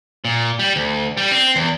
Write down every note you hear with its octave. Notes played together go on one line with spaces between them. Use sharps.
A#2
G3
D2
G3
C4
E2